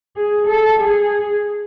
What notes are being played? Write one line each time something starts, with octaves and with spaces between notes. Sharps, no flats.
G#4
A4
G#4